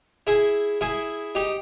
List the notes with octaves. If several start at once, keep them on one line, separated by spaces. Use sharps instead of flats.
E4 G#4
E4 G#4
D#4 G4